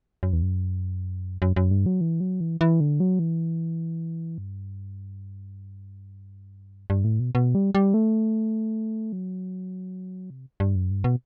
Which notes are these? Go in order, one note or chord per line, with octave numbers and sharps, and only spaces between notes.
F#2
E2
F#2
F#2
F#2
G2
F#3
E3
F#3
E3
E3
D3
F#3
E3
G2
G2
A2
B2
B2
G3
G3
A3
F#3
C3
G2
F#2
G2
B2